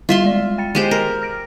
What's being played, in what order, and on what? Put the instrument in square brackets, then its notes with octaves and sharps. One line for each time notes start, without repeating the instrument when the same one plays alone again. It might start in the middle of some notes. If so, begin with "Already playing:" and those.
[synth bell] G3 E4 [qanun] F4 E5 C6
[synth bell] G#3 D5
G5 A6 C#7
[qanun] G#3 G4 C5
A#4
[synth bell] F6 A#6 D7